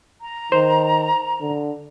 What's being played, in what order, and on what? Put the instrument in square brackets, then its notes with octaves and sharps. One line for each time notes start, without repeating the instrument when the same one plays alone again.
[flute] A#5
[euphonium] D#3 [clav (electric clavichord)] C5
[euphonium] D3